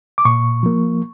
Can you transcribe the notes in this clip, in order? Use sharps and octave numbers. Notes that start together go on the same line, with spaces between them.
D6
A#2 C#6
F3 A#3